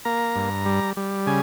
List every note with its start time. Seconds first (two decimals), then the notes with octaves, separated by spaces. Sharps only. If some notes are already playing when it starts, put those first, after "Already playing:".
0.05 A#3 A#5
0.36 G2
0.66 G3
0.97 G3
1.27 C#3 G#5